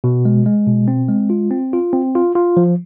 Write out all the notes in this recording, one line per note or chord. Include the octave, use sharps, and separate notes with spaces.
B2
G#3
G#3
B2
C4
G#3
F4
C4
F4
C4
F4
F4
F3